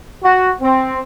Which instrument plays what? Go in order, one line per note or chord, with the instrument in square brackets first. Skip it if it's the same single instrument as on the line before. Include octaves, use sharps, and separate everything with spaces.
[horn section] F#4
C4